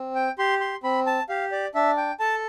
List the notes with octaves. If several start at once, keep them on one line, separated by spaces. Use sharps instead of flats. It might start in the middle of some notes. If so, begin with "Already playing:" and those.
Already playing: C4
G5
G4 C6
C6
C4 B5
A5
G4 F5
D5
D4 E5
G5
A4 A5